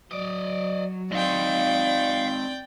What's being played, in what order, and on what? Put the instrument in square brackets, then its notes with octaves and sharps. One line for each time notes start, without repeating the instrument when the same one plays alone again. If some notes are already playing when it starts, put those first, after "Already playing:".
[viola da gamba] F#3 [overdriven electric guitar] D5 D#5
[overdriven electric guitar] C4 D#4 [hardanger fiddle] D5 G5 [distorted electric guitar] D#5 F5